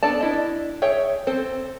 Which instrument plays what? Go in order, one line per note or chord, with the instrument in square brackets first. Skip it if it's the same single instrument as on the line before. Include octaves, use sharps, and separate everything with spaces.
[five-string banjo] B3 D4 A4 D5 A5
D4 E4 D#5
G#4 C#5 E5 G5
C4 A4 C5